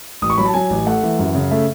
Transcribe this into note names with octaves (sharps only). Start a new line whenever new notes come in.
A1 D#6
C#6
F#3 B5
A5
F#3 G#5
A1
A3 F#5
E3
F#2
C#3
A3 E5